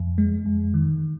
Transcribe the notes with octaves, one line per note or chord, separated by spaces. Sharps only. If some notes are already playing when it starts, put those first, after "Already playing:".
Already playing: F2
G#3
F2
D#3